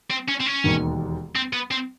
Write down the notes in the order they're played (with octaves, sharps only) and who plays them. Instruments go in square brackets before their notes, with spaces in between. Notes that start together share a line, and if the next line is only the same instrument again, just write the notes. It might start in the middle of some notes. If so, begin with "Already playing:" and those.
[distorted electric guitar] C4
C#4
C4
C#4
[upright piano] E1 D#2 D#3
[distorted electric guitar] C4
B3
C4